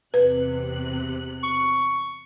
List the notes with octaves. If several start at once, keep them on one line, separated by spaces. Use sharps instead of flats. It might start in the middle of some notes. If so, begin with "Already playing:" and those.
E2 C3 B4 F#6
C#6